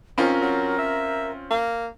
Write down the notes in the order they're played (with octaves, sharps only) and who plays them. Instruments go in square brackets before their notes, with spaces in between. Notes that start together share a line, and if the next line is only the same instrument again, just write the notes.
[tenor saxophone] D#3 [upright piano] C4 C#4 F4 [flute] A#4
[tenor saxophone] F#3
E5
A#3